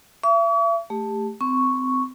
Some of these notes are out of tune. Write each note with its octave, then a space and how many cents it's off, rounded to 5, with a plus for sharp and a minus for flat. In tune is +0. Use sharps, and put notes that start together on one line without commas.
E5 +40 C#6 +45
A3 +0 G4 +25
C4 -25 C#6 +0